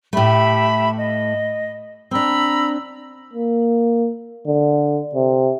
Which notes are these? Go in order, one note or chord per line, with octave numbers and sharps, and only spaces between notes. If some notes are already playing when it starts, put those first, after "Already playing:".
A2 A3 G4 E5 B5
D#5
C4 D4 A#5 B5 E6
A#3
D3
C3